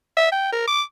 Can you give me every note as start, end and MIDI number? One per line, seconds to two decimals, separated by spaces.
0.17 0.28 76
0.32 0.48 79
0.52 0.65 70
0.67 0.82 86